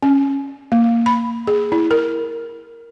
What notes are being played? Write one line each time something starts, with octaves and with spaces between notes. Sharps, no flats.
C#4
A#3
B5
G#4
E4
A#4